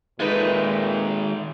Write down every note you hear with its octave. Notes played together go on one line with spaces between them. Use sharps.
A#2 D#3 G#3 A3 D#4 B4